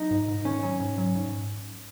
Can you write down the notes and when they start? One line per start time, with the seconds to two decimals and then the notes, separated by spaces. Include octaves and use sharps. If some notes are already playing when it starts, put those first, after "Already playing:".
Already playing: F#3 D#4
0.11 G#2
0.28 G#2
0.45 D#3 C#4
0.63 F#3
0.80 G#2
0.98 F#3
1.15 G#2